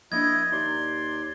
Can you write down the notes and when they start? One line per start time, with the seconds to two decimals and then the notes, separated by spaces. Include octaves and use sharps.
0.12 F3 A#3 D4 E4 D#5 G#6
0.52 D#2 D5 A#5 C6 G6